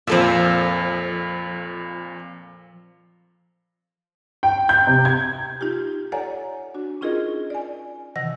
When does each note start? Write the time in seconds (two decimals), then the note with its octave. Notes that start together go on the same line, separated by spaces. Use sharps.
0.07 F2 A#2 F3 A4 E5
4.43 G5
4.69 G6
4.87 C3
5.05 G#6
5.61 D#4 F4 G4
6.12 A4 C#5 D5 F#5 G#5 A#5
6.74 D4 F#4
7.01 C#4 D#4 F4 G#4 A#4 D#5
7.50 D5 G#5
8.16 C3 D#3 E3 F#5 E6 A#6